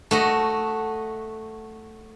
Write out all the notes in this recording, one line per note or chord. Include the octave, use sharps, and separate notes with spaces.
A3 F#4 D#5